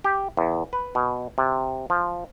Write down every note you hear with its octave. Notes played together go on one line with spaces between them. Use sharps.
G4
E2
B4
B2
C3
F3